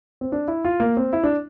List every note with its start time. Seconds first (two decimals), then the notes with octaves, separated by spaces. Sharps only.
0.21 C4
0.32 D4
0.48 E4
0.65 F4
0.80 A#3
0.97 C4
1.13 E4
1.24 D4